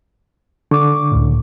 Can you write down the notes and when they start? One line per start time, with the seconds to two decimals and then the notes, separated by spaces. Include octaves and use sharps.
0.71 D3 C#6 D6
1.11 C#2 A2